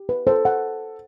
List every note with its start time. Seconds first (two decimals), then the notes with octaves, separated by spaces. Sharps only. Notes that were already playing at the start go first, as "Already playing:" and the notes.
Already playing: G4
0.09 B4
0.27 A4 C5
0.45 F#5